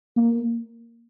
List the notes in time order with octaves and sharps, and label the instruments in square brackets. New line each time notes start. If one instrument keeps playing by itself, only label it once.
[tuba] A#3